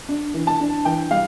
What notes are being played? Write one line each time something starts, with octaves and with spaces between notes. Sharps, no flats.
D4
E3
A5
D4
E3 G5
G3 F5